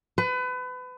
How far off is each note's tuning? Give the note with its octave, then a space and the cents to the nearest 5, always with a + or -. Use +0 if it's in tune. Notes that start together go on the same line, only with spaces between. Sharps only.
B4 +30